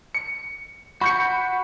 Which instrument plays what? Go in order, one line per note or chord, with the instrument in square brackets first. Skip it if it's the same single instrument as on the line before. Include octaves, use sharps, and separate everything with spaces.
[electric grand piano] C#7
[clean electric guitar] F#4 [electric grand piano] B5 G6 C#7